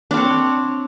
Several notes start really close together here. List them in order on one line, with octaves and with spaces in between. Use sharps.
D4 C4 C#5